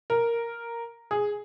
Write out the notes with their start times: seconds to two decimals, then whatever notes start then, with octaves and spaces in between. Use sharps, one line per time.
0.10 A#4
1.11 G#4